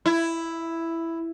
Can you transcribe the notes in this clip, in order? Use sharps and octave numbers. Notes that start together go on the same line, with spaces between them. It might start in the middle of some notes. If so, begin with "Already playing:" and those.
E4